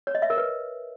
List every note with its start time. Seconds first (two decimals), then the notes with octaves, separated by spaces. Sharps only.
0.07 C#5
0.15 D#5
0.22 E5
0.30 A#4
0.38 B4